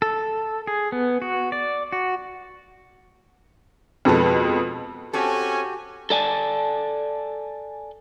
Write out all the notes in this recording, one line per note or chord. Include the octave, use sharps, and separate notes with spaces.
A4
G#4
B3
F#4
D5
F#4
F2 B2 G#3 A4 B4
C4 C#4 F#4 G4 A4 G#5
A4 D5 G#5 A5